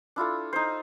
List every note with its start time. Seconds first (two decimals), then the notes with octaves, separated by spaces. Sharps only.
0.16 D4 E4 F4 A4
0.53 D#4 C5